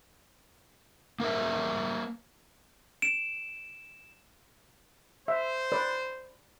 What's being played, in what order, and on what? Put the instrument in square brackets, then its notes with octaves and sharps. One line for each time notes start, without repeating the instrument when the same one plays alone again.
[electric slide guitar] A#3 A#4 B4 E5
[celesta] D7 [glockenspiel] E7
[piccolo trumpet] C5 [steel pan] E5
[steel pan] B4 D5